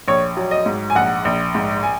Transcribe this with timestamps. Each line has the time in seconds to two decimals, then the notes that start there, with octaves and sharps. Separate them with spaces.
0.08 A#1 C#5
0.37 F#3
0.51 D#5
0.66 G#2
0.90 G#5
0.95 A#1 F#5
1.25 A#1
1.55 G#2
1.83 G#5